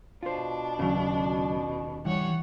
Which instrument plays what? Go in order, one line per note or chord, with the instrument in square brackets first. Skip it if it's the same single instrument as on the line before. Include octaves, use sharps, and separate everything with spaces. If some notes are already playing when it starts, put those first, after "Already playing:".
[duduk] B2 [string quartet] D4 [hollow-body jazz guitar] F4 C5
[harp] D#1 C#4 [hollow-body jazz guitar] C#3 F#3
[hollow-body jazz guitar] G2 [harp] E3 [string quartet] G3 C#5 F#5